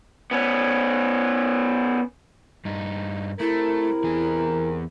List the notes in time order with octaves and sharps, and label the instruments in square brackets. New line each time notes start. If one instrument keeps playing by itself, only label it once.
[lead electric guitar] B3 C#4
[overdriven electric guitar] G2 D#4
[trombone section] C3 A#4 [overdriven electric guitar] A3 [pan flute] E4
[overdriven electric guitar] E2 G#4